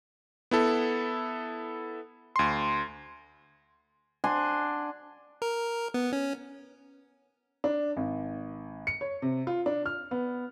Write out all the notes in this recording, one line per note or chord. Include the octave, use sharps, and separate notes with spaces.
B3 E4 A4
D2 C6
D4 F#5 G#5 C6
A#4
B3
C#4
D4
G#1
C#7
C#5
C3
F4
D4
F6
B3